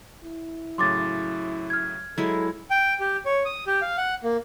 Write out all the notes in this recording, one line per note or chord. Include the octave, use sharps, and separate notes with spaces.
E4
A2 C#3 F#3 C6 D6 A6
F6 G#6
F#3 G#3 E4 A4
G5
G4
C#5
D#6
G4
F5
F#5
A#3